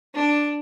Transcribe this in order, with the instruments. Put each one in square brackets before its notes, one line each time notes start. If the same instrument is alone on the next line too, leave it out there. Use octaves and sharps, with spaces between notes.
[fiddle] D4